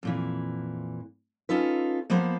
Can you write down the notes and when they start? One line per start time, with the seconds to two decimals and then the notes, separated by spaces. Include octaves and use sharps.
0.03 F2 A#2 E3
1.49 C#4 D#4 F4 A4 B4
2.10 F3 A#3 B3 B4 C5